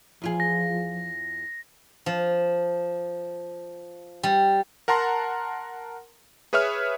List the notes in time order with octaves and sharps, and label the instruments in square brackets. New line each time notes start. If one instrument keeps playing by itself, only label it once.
[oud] E2 F4 G#4 [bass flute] F3
[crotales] A#6
[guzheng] F3
G3
[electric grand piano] A#4 F#5 A5 A#5 C6
G#4 B4 C#5 E5 D#6 F6